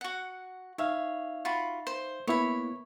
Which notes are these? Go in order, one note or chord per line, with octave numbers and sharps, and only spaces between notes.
F#4 F#5
D#4 C#5 E5 F5
F4 F#4 B5
C5
A#3 B3 E4 C#5 B5